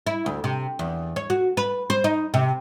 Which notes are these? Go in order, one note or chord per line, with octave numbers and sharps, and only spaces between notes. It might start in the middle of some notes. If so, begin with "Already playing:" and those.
E4
D2
C3
E2
C#5
F#4
B4
C5
D#4
C3